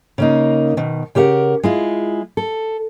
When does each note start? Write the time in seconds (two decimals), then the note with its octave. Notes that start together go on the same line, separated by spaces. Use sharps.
0.18 C#3 A#3 D#4
0.77 B2 D#3
1.15 C#3 G4 A#4 E5 F#5
1.63 G#3 E4 F4
2.37 A4